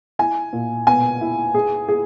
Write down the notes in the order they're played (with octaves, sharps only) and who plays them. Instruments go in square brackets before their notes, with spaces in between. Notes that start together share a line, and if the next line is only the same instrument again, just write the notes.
[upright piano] E4 [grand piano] G#5
[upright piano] A#2
[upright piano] B2 [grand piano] G#5
[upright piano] E4
G#4
G#4